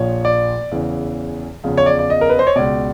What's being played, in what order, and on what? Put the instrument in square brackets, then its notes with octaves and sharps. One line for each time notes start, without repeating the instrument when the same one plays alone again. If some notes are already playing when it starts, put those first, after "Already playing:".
Already playing: [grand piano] A#1 A#2 F3 C#5
D5
E2 C#3 E3
E2 C#3 F3
C#5
D5
D5
D#5
A#4
B4
C5
C#5
C#2 B2 D5